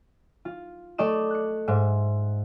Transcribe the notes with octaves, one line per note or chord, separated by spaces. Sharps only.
F4
A3 A4 D5 D#5 E7
F#6 C#7
G#2 E5 D#7